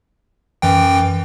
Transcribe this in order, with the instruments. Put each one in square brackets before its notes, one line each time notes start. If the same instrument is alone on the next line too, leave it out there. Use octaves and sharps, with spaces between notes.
[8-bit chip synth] F#2 E3 G5